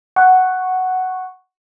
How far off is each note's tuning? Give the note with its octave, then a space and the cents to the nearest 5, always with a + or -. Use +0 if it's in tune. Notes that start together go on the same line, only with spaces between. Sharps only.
F#5 +5 C#6 -5